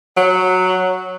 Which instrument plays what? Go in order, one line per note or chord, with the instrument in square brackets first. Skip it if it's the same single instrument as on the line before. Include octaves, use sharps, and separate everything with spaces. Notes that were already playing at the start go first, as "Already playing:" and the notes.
[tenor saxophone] F#3